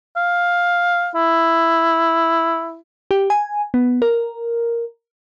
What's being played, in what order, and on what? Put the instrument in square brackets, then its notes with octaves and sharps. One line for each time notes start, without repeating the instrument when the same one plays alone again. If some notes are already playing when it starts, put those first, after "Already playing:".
[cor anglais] F5
E4
[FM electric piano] G4
G#5
B3
A#4